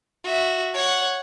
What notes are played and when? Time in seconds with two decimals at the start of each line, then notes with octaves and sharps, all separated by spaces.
0.24 F#4 E5
0.74 C#5 F#5